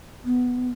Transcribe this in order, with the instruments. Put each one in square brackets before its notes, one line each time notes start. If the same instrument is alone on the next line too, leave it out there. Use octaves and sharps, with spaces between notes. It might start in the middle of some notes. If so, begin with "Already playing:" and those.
[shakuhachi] B3